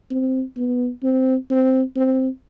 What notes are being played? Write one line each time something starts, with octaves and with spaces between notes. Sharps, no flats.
C4
B3
C4
C4
C4